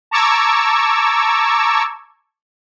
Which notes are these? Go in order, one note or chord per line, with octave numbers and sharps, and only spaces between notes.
A5 A#5 C#6 D6 E6 G#6